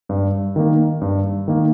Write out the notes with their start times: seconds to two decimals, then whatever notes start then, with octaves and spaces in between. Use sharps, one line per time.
0.09 G2
0.56 D#3 A#3
1.01 G2
1.48 D#3 A#3